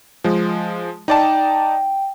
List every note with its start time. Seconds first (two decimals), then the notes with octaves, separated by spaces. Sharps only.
0.24 F3 G#3
1.08 D#4 D5 G5 A5